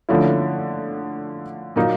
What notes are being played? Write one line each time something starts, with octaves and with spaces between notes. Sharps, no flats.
D3 F3 A3 C#4 E4
A#2 F#3 A#3 D#4